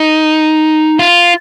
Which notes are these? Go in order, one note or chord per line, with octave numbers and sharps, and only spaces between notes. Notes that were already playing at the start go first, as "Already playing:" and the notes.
Already playing: D#4
F4